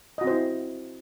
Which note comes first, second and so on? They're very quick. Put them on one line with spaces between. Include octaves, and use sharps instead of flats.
D#5 F#4 C4 C5 E4